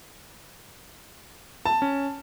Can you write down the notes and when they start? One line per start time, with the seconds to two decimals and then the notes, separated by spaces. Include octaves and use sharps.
1.65 A5
1.82 C#4